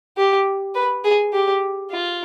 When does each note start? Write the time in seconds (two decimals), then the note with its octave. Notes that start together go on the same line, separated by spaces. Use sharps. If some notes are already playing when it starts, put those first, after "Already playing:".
0.17 G4
0.75 B4
1.04 G#4
1.33 G4
1.91 F4